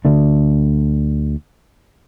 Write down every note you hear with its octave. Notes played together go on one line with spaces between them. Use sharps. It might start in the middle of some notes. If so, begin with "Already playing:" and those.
D2 D3 A3 D4